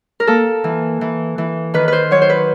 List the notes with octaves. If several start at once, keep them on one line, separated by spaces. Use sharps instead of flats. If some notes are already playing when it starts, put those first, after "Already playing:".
A#4
A#3 A4
E3
E3
E3
D#3 B4
B4 C5
F#3 C#5
C5
B4